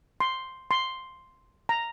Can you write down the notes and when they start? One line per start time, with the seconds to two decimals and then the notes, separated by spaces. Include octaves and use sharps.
0.20 C6
0.71 C6
1.69 A#5